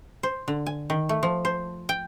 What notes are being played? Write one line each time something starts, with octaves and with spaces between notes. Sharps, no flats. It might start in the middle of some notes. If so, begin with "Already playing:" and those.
C5
D3
G#5
D#3
A3
F3
C5
G5